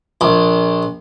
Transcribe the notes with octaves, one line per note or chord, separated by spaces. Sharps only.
A#1